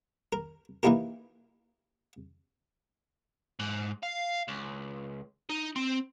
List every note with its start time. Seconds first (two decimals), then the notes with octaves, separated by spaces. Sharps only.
0.33 A#4
0.83 E3 A#3 D#4 E4 G4 A#4
3.59 G#2
4.03 F5
4.48 C#2
5.49 D#4
5.76 C4